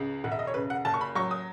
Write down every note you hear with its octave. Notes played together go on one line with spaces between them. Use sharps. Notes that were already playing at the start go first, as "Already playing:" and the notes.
Already playing: C#2 C#3
E1 F#5
E5
D#5
C#5
C#3 B4
F#5
F#1 A5
C#6
B5
F#3 C#6
D#6